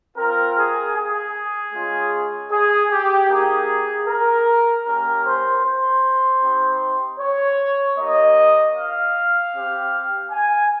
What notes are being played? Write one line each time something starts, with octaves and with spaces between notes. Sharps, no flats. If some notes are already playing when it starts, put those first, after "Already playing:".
C4 F4 A#4
G#4
G#4
G#3 C#4 F4
G#4
G4
A#3 D#4 G4 G#4
A#4
A#3 C#4 G4 A#4
C5
C5
C4 D#4 G4
C#5
A#3 D#4 G4 D#5
F5
C4 G4
G#5